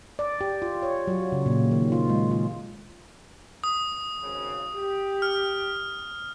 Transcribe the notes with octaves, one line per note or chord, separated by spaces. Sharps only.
D5
G4
F4
C#5
F#3
C#3
A#2
D#3
F4
G#3
F4
D#6
G#1 C#3
G4
F6